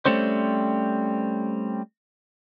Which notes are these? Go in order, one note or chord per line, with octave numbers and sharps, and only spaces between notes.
G3 A3 C4 C#4 C5